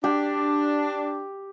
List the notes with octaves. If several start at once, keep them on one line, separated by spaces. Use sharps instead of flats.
D4 G4